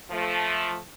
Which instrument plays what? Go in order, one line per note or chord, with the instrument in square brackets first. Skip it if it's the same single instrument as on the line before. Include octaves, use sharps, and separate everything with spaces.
[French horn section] F3 A3